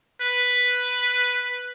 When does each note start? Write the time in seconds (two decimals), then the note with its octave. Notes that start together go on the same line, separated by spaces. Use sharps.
0.22 B4